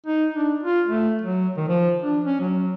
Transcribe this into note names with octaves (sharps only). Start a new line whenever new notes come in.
D#4
D4
F4
A3
F#3
D#3
F3
D4
C#4
F#3